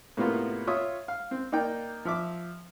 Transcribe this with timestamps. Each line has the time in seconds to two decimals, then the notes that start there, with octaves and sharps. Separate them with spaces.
0.17 A2 C3 A#3 B3 F4
0.67 F4 C#5 E5 D#6
1.08 F5
1.31 C4
1.52 A#3 D#4 D5 G5
2.05 F3 E5 D6